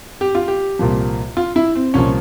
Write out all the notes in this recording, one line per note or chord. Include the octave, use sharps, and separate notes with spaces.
G4
F4
G4
C2 A#2 F3
F4
E4
C4
C2 A#2 F3 C#4